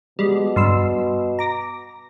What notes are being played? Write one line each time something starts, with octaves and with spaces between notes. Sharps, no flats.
B2 G3 G#3
G2 C6 E6
A#5 D6 A#6